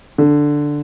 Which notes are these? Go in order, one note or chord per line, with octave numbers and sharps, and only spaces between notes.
D3